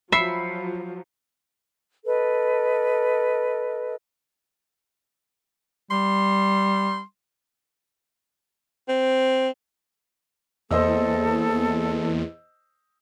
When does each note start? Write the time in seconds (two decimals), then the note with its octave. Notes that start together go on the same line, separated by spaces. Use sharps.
0.12 F3 F#3 E5 B5 C7 C#7
2.05 A4 B4 D#5
5.91 G3 C6
8.89 C4
10.71 E2 A#3 A4 C5 D#5 E6